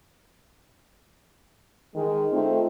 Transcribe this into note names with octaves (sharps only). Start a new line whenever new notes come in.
D#3 G#3
A3 C4 D#4 F4